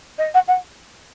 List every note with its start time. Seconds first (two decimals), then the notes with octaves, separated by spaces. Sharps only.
0.18 D#5
0.34 F#5
0.48 F#5